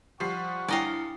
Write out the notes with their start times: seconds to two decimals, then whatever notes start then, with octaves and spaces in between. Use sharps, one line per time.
0.20 F3 G3 C5 F#5 C#6 C7
0.69 G2 D4 E4 D5 D#5 F5 G5